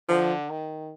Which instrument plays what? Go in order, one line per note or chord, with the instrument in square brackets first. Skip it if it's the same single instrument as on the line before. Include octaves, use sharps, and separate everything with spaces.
[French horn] D3 [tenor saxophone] F3
[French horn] D#3